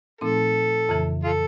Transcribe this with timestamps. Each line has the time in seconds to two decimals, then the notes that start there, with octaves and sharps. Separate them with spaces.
0.21 A#2 F3 A3 C4 D#4 A4
0.89 F2 C#3 E3
1.24 F4 A4